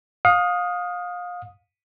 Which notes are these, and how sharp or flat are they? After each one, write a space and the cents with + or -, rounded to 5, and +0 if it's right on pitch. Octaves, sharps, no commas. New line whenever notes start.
F5 +30 D#6 +0